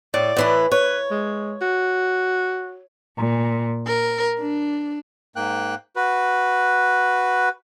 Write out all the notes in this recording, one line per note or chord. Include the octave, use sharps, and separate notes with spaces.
A2 D5
A2 E3 B4
B4 C#5
G#3
F#4
A#2
A#4
D4
G#2 A#3 G5 F#6
F#4 B4